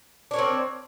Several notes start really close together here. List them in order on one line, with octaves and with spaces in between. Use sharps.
D4 C#5 A#4 C4